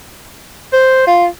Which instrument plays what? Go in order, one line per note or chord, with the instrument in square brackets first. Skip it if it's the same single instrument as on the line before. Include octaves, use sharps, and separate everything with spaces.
[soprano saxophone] C5
F4